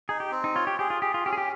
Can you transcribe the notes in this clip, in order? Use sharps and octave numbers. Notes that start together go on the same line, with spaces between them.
D#4 G#4
G4
C4
D#4
F4 C#5
G4
G4 G#4
F4
G4 G#4
F4
C#4 G4
G#4
G4